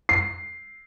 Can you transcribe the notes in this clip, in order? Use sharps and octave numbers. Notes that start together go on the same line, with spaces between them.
C7